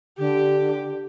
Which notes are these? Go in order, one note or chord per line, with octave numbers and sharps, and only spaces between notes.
D3 G4